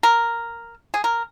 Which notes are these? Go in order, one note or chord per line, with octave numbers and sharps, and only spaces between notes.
A#4
G#4
A#4